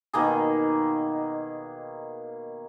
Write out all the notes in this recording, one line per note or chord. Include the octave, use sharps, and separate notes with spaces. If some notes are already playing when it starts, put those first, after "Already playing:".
B2 D#3 A#3 G#4